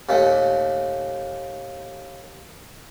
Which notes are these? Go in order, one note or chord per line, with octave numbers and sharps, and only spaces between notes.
D#2 A#2 A3